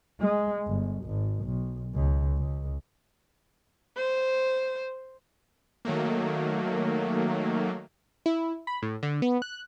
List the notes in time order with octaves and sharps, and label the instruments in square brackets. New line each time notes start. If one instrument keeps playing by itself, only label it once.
[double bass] G#3
G1
G#1
B1
C#2
C#2
[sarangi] C5
[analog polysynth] D#3 F#3 A3 A#3
[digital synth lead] E4
B5
A2
D3
B3
F#6